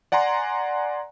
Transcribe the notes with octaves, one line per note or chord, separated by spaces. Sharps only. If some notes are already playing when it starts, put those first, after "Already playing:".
D5 F#5 G#5 A#5 C6